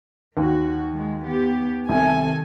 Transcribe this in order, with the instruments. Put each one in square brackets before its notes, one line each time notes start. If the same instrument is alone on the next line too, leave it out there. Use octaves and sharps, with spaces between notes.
[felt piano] D#2 [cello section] D#3 F#4
[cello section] D#3 G#3
B3 G4
[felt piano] C2 C3 [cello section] D#3 [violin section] A4 G#5